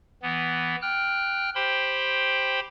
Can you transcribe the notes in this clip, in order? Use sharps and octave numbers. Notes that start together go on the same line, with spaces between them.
E3 B3
G5 F6 F#6
G4 C5 G5 B5 C6